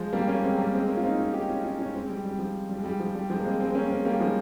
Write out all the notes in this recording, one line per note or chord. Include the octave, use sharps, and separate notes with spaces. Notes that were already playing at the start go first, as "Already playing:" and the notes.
Already playing: F3 G#3
G3 A#3
A#3 C#4
G#3 C4
G3 A#3
G#3 C4
A#3 C#4
F4
C4 D#4
C#4 F4
D#4 G4
C#4 F4
C#4 F4
C#4 F4
G#3 C4
G3
G3
F3
G3
G#3
G3
F3
G3
F3 G#3
A#3
G#3 C4
G#3 C4
C4
A#3 C#4
G#3 C4
G3 A#3
F3 G#3